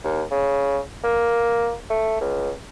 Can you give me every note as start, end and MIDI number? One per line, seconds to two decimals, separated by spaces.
0.04 0.23 39
0.31 0.79 49
1.04 1.74 58
1.90 2.20 57
2.21 2.51 37